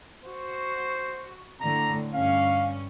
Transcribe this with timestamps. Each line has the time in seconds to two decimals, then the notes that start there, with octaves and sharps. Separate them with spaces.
0.24 F#4 C5
1.61 A2 D3 A#5
2.14 G2 C#4 F5